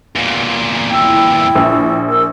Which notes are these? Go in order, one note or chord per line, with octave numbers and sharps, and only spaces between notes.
E2 A#2
E4 G5 E6
A#1
A#4 E6